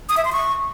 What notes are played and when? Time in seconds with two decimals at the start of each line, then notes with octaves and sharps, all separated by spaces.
0.09 D#6
0.17 E5
0.25 C6
0.33 C#6